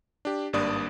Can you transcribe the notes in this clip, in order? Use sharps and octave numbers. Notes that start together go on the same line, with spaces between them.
D4 G4
G#1 G2 A#3 D4 D5 D#6